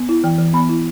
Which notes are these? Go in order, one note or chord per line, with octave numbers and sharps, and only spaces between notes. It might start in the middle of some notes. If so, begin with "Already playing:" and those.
Already playing: B3
E4
E3 G5
E3
B3 B5
E4